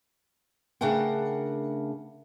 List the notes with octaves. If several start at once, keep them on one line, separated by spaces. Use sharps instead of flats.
C#3 A3 D4 A#4 F#5 G5